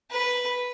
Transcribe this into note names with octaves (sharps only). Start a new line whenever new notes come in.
B4